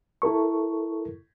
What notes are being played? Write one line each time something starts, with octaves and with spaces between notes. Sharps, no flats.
E4 A4 A#4 C#6